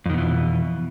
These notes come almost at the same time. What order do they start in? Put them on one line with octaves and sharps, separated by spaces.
F2 D#3 B2 E3